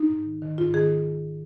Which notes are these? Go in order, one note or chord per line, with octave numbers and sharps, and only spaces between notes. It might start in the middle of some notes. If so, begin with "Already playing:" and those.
Already playing: D#4
G#2
D#3
D#3
G#2 F4
D#3 G#4